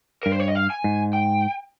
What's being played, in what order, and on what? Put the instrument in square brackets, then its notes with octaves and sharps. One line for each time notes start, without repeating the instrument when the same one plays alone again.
[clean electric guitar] G2 [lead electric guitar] A#4
[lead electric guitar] C5
C#5
D#5
F5
G#5
[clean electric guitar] G#2
[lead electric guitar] G5